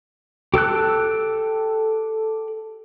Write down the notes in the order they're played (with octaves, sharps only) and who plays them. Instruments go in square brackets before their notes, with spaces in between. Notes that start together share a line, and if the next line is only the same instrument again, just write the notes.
[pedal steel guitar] G4 A4 E6 F#6